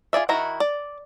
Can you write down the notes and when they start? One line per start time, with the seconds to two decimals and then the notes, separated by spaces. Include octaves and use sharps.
0.13 F4 G#4 D5 E5
0.29 D#3 E4 F#4 A#5
0.60 D5